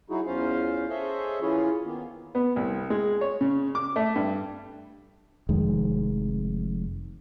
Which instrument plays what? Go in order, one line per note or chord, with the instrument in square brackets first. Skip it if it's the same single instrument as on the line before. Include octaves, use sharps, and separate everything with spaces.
[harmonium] F#3 D#4 E4 F#4 G#4
E2 C#4 F4 C5 F5
G#4 A4 C5 C#5 D#5 E5
E3 C#4 E4 F4 G#4 C#5
D#3 A#3 B3
[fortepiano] B3
C2
G#3
C#5
C#3
D6
A3
G2
[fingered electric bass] F1 F2 D#3 G#3